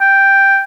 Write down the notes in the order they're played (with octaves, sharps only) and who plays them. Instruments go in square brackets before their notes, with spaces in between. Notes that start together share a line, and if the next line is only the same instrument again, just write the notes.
[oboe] G5